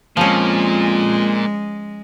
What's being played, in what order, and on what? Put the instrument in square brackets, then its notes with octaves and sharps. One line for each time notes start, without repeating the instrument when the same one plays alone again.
[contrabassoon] F2 [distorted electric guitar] A#2 [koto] F3 C#4 [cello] G#3